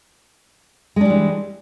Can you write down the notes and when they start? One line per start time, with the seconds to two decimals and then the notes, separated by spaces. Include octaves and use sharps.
0.96 G#3
1.01 D4
1.05 G3
1.10 E3